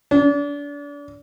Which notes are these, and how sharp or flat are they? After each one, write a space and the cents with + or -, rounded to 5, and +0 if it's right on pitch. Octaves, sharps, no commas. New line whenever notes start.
D4 -35